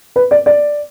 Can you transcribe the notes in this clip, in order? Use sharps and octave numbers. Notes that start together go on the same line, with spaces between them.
B4
D5
D5